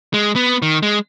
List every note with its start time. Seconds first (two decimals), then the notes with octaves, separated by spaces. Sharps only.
0.14 G#3
0.36 B3
0.62 D#3
0.83 G#3